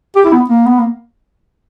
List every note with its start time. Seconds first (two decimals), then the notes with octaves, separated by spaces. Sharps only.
0.16 G4
0.25 E4
0.32 B3
0.50 A#3
0.66 B3
0.79 A#3